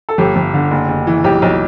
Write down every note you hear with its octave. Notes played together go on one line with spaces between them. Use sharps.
A4
G1 G4
G1
D3
F#1
F#1
E3
B1 G4
B1